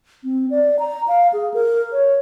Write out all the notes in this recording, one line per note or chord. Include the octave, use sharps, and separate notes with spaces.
C4
D5
A#5
F5
G#4
A#4
C#5